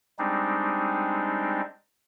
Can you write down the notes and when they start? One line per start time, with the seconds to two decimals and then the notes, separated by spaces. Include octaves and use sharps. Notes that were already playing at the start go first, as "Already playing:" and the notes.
0.19 G3 G#3 C4 D4 D#4